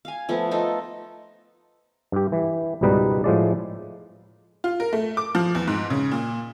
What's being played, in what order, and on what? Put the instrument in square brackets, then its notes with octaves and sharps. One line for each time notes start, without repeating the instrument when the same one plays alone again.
[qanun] F5 G#5
F3 A3 B3
D#4 F4 A4
[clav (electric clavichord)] G2 G4
E3
C#2 G#2 B2 G3 D#4 B4
A2 F3 G#3 D5
[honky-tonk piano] F4
A#4
A3
D6
F3
E2
G#2
C#3
A#2